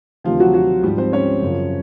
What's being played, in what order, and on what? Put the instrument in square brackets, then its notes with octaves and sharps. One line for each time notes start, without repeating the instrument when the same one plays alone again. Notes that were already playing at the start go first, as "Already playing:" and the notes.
[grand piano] D2 C3 D#3 F3 F4
F#3 F#4
F#3 F#4
G#2 F3 G3 G4
C4 C5
C#4 C#5
F#2 C#3 F3